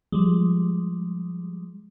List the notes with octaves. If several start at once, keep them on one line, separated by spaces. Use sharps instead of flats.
F3 G3 G#3